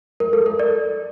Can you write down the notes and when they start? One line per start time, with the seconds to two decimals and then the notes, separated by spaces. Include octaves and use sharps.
0.20 A#4
0.33 A4
0.46 A#4
0.59 D5